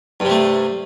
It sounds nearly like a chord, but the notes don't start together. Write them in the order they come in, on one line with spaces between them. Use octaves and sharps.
G2 C3 A3